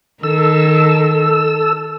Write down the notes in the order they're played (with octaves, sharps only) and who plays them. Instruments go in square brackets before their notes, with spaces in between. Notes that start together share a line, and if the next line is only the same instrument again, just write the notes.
[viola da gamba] D#3 [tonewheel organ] A4 E6